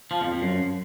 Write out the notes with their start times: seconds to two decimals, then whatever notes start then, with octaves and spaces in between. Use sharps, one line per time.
0.11 F3
0.21 F2
0.32 F2
0.42 F#2